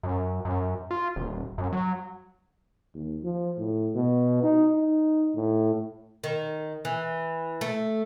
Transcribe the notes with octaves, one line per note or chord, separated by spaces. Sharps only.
F#2
F#2
F4
D#1
F#2
F#3
D#2
F3
A2
B2
D#4
D#4
A2
D#3
E3
A3